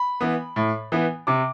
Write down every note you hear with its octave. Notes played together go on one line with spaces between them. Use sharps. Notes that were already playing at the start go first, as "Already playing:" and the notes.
Already playing: B5
E3 B3
A2
E3 B3
C3 D6